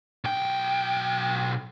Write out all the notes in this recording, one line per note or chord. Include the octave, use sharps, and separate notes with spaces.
B1 G5